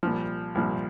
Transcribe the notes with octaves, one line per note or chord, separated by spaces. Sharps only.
C2 A#2 F3
C2 A#2 F3